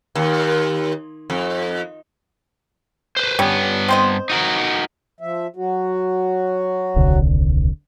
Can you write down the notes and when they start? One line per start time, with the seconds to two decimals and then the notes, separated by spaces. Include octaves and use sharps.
0.15 D#2
1.30 F2
3.17 B4 C5
3.39 G2 G3 B3 C#4
3.88 C4 C5 D#5
4.30 D#4 F#4 A#4
5.21 F3 E5
5.56 F#3 F#4
6.96 D#1 C2 D3